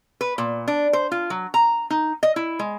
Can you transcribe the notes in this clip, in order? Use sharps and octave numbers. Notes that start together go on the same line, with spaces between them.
B4
A#2
D4
C5
F4
F#3
A#5
D#4
D#5
E4
G#3